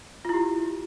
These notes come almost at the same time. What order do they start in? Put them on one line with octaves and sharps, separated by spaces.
F4 E4 G4